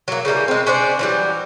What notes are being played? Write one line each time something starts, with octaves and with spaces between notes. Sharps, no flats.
F#3 A#3
C#3 E3 G3 A#3
G#3 C4
C#4 D4 C5 D5
E3 F#3 G3